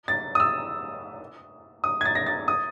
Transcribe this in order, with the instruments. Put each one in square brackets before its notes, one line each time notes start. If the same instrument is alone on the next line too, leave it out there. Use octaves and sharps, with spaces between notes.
[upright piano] A6
D#6
E6
D#6
G#6
A6
A#6
A6
D#6